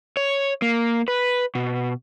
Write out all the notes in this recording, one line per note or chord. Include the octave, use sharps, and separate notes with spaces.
C#5
A#3
B4
B2